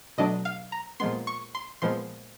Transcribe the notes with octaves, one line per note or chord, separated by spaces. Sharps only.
B2 F#3 A3 D4 D#5
F5
A#5
A#2 F3 G#3 B3 C6
C#6
C6
A#2 F3 G#3 B3 C6